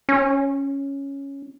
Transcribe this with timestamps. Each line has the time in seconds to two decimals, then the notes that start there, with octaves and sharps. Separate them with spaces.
0.09 C#4